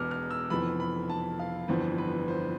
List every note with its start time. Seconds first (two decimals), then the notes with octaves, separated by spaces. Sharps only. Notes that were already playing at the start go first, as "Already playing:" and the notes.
Already playing: E1 E2 B2 B3 D6 F6
0.11 F6
0.31 E6
0.50 F1 F2 E3 B3 B5
0.80 B5
1.09 A5
1.39 F5
1.68 G1 F2 E3 B3 C5
1.98 B4
2.28 C5